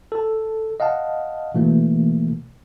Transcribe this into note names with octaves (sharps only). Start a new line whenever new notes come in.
A4 A5
D#5 F5 F#5 A5
B2 E3 A3 A#3